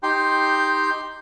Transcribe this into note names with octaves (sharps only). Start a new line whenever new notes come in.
D#4 G4 G5 C6